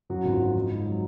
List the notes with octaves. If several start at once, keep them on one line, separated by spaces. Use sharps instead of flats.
F#2 F#3 F#4
G#1
F4
F3
G#2
G#2
F#3